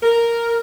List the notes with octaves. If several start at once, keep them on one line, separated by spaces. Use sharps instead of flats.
A#4